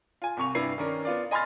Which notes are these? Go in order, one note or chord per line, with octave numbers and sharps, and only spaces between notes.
F4 G#5
C2 C3 C#6 F7
G2 C3 E4 B4 C7
D#3 C#4 D4 A#4
B3 F4 D5
D#5 G#5 B5 C6 F6 A6